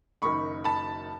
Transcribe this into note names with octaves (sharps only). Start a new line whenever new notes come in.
F#1 F#2 D#3 B5 C#6
A5 B5